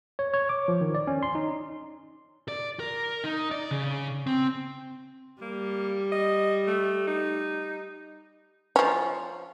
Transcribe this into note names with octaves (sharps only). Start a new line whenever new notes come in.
C#5
C#5
D6
F3
D#3
D5
C#4
C6
D#4
D5
A#4
D#4
D5
C#3
C4
G3 A#3
D#5
A3
D#4
F3 C#4